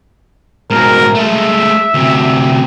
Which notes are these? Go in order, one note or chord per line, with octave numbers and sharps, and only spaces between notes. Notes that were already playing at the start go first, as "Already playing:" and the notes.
G#2 B2 A#4
G#3 A3 E5
D2 C3